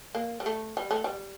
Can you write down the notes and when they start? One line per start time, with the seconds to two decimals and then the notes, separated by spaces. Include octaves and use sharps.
0.15 A#3
0.40 G3
0.46 A3
0.77 G3
0.91 A3
1.04 G3